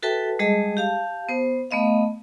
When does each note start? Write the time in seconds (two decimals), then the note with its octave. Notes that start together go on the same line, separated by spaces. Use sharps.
0.03 F#4 A4 B4 E5 G5 A5
0.39 G3 G#3 G#4 D#5 A5
0.77 G4 F5 A5
1.29 B3 C5
1.71 A3 B3 D#5 F5